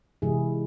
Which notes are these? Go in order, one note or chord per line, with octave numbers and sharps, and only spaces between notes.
C3 E3 G#3 E4 G#4